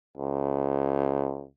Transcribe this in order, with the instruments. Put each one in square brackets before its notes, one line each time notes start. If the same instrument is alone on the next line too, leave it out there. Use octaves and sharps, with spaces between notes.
[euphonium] C#2